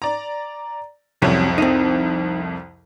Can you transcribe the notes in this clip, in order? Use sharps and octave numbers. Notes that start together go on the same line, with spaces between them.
D5 A#5
C2 F2 C3 F#3 C#4
C4 D#4